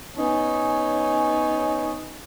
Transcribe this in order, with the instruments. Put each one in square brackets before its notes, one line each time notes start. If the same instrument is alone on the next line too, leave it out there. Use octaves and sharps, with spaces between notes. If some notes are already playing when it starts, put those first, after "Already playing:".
[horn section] B3 C#4 D#4 C#5 G#5